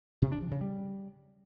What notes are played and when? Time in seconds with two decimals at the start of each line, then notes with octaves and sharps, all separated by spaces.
0.22 C3
0.32 D4
0.41 F3
0.51 C#3
0.61 G3